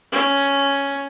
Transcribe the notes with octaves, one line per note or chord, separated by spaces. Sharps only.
C#4